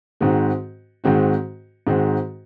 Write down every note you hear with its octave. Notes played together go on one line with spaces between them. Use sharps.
G#2 D#3 G#3 C4 F#4
G#2 D#3 G#3 C4 F#4
G#2 D#3 G#3 C4 F#4